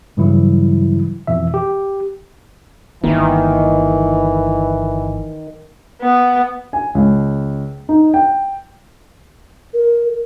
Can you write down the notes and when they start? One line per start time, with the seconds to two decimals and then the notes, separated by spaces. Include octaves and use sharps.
0.17 G2 C#3 E3 F#3 G3 E4
1.27 F2 B2 E3 E5
1.54 G4
3.03 G1 D#3 E3 A#3
6.02 B3
6.73 G#5
6.95 C#2
7.89 D#4
8.14 G5
9.74 A#4